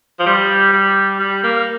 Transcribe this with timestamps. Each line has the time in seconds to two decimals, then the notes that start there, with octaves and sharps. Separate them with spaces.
0.19 F3
0.26 G3
0.73 G3
1.20 G3
1.43 A#3